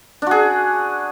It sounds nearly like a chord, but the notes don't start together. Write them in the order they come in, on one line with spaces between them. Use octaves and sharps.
D4 F#4 G#4